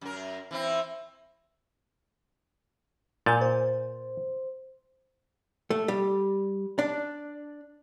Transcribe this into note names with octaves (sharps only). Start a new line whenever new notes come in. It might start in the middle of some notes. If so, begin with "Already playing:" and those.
F#2 A#4
E3 C4 E4
A#2 G#5 G6 A6
C5
A3
G3
D4